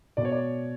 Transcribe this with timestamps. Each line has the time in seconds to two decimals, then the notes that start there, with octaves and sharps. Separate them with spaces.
0.17 B2 D5
0.25 C#5
0.32 D5